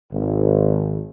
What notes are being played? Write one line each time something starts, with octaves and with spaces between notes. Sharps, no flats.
G#1